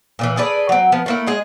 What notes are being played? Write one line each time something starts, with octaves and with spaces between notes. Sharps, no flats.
A#2 D3 E3
G#4 A4 B4 D5
F#3 C4
F3 B3
A3 A#3 E4
G#3 G#4 D#5